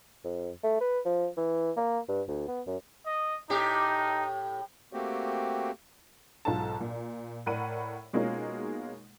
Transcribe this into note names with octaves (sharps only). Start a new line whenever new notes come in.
F2
A3
B4
F3
E3
A#3
G2
D2
B3
F#2
D#5
A2 D#4 G4
A3 A#3 C4 F#4 G4
B1 G#2 F4 A4 A5
A#2
A2 A#4 D5 F#5 B5 D#7
B2 G#3 A#3 C#4 D#4 F4